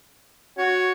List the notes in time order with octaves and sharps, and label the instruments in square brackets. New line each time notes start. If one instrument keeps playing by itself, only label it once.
[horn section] F#4 [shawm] C#5